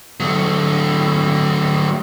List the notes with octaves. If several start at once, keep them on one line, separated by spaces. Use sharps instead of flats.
F#3 A3